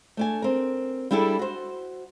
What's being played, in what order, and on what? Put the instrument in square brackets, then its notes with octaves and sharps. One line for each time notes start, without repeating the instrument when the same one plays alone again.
[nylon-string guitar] A3 D4 G#5
C4 A#4
G3 D4 E4 G#4 A4
F#4 C5